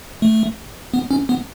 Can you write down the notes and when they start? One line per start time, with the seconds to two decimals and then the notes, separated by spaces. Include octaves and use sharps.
0.22 A3
0.94 B3
1.11 C#4
1.29 B3